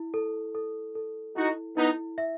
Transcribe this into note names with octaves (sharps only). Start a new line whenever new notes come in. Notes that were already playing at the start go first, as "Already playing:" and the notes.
Already playing: E4
A4
A4
A4
D#4 E4 F#4
B3 D#4 E4
E5